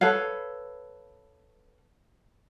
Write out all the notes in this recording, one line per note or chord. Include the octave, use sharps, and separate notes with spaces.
A4 B4 C#5 F5